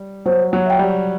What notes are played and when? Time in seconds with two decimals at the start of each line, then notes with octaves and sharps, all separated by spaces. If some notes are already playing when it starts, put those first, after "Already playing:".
Already playing: G3
0.26 F#3 C5
0.53 F#3
0.66 E5 G5
0.79 G3